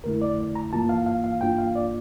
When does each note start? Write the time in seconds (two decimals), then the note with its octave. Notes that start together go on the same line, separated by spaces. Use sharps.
0.04 F2 D3 A3 E4 A#4
0.22 D5
0.55 A#5
0.73 G2 E3 A#3 F4 A5
0.89 F5
1.06 F5
1.24 F5
1.41 G2 E3 A#3 D4 F4 G5
1.59 F5
1.75 D5